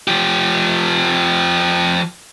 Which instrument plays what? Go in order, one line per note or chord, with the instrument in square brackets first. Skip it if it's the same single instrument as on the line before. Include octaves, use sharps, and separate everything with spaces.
[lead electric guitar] F3 G4